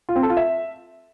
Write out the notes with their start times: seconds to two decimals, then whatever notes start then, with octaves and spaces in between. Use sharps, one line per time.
0.09 F4
0.16 C4
0.23 A4
0.30 F4
0.37 E5